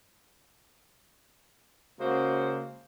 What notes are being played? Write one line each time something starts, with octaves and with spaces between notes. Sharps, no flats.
C#3 G#3 A#3 F#4 C5